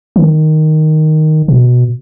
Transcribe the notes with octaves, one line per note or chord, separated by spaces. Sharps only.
D#3
B2